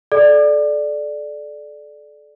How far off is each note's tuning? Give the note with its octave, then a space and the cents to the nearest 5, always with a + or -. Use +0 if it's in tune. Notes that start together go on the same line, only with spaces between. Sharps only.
A4 -30 D5 +5